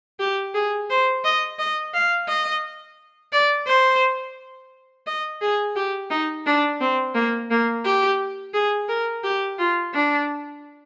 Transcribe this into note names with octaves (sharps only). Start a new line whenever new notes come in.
G4
G#4
C5
D#5
D#5
F5
D#5
D5
C5
D#5
G#4
G4
D#4
D4
C4
A#3
A#3
G4
G#4
A#4
G4
F4
D4